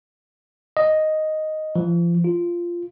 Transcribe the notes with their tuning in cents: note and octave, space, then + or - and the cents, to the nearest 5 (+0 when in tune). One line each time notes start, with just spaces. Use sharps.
D#5 +0
F3 -35
F4 -10